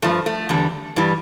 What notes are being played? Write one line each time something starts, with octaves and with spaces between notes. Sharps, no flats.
G2 F3 A3
A3
E2 D3 G3
G2 E3 G3